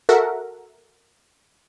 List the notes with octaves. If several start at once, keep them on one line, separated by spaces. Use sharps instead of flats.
F#4 A4 A#4 E5 F#5